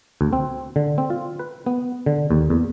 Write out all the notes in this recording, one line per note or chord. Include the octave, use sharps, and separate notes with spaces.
D2
C4
D3
C4
F4
B4
B3
D3
D#2
E2